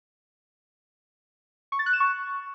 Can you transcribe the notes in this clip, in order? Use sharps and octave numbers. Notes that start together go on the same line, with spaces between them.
C#6
A6
F#6
E7
C#6